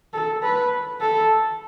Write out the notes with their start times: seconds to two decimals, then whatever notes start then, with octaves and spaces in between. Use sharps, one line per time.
0.13 A4
0.43 B4
1.01 A4